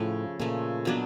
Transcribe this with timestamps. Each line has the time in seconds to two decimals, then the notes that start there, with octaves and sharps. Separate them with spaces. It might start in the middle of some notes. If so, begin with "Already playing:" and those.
Already playing: A2 C#3 F3 A3
0.40 A#2 C#3 F3 A3
0.85 B2 F#3 B3 D4